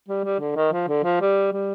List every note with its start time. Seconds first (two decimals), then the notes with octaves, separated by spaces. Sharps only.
0.09 G3
0.25 G3
0.40 D3
0.56 D#3
0.73 F3
0.88 D3
1.04 F3
1.21 G3
1.53 G3